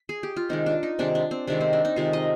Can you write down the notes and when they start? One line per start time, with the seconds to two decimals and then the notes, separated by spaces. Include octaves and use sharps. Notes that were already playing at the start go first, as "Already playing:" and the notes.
Already playing: A#4
0.09 G#4
0.23 G4
0.36 F4
0.49 C3 D#3 G#3 D#4
0.66 D4
0.83 D#4
0.99 C3 D#3 G#3 D4
1.15 D4
1.31 C4
1.47 C3 D#3 G#3 D4
1.61 C4
1.73 D4
1.85 D#4
1.96 C3 D#3 G#3 F4
2.13 D#5